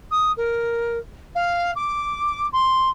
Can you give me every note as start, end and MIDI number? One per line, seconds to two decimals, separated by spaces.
0.10 0.31 87
0.37 0.98 70
1.35 1.71 77
1.75 2.46 86
2.52 2.88 84